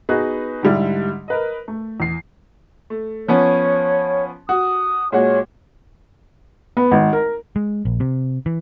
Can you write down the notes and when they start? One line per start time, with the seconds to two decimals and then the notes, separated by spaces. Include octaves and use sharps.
0.09 B3 D#4 F#4 G#4 B4
0.63 G#2 D3 G3 D4 E4
1.28 A#4 B4 D#5
1.68 A3
2.00 E2 C7
2.90 A3
3.28 F3 B3 C#4 C#5
4.49 F#4 D#6
5.12 A#2 G#3 F#4 C#5
6.77 B3
6.91 G#1
7.13 A#4
7.56 G#3
7.85 A#1
8.00 C3
8.46 E3